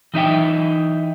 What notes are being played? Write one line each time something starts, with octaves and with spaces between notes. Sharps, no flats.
E3 D#4 E5 G5